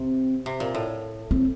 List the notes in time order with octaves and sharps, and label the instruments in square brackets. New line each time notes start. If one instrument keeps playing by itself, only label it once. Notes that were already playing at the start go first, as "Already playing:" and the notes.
Already playing: [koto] C3 [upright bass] C4
[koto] C3
A#2
A2
[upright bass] C4